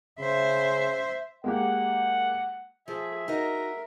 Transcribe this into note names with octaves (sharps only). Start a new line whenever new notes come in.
C#3 C5 E5
G#3 A#3 G4 F#5
F3 G#4 E5
D#4 F#4 A#4 D#5